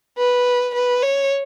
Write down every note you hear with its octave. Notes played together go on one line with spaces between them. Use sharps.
B4
B4
C#5